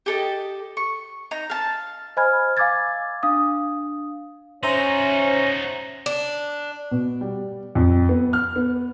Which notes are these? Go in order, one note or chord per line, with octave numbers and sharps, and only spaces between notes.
G4 A4 D#5
C#6
D#4 A#5
F5 A5
C5 D#5 G#5 B5 F6 G#6
F5 G#5 D6 E6 G#6 A6
D4 F5 D#6
C#4 D#4 F#4 C5 E5 A#5
D4
B2
G3
F2
B3
F6
B3